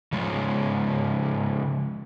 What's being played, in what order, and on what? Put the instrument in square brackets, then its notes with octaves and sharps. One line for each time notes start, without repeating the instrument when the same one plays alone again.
[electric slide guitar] C#3 F3 G#3